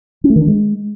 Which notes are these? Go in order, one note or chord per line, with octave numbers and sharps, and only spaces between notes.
C#4
A3
D#3
D4
G#3